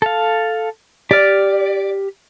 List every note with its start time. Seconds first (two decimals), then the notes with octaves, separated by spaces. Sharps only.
0.02 A4 F5
1.11 G4 D5 F6